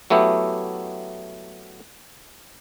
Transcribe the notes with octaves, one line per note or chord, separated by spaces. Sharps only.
F#3 A3 B3 E4 G4